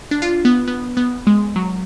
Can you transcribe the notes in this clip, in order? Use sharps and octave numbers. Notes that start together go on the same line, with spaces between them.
D4
F4
B3
B3
B3
G#3
F#3